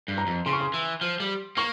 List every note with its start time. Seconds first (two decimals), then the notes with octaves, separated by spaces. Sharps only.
0.08 G2
0.18 A#5
0.27 F2
0.46 C#3 C6
0.53 C#6
0.60 C6
0.74 E3
1.01 F3
1.20 G3
1.57 A#3 C#6